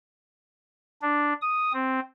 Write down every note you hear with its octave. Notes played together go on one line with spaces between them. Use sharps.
D4
D#6
C4